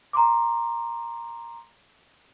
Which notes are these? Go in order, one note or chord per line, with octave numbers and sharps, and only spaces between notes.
A#5 C6 D6